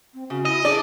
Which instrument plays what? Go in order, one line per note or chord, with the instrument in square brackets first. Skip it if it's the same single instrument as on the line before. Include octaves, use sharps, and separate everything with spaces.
[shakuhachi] C4
[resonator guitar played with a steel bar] C#3 [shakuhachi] F#4
[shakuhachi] E4 [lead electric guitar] D#5
[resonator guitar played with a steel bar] D4 [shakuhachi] G#4 [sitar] D5